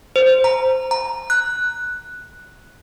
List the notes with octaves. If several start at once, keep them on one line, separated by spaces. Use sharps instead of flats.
C5
A#5
A#5
F#6